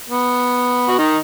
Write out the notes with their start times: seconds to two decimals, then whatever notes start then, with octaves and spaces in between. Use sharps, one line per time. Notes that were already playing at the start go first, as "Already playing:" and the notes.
0.10 B3
0.88 F#4
0.98 D#3 D#4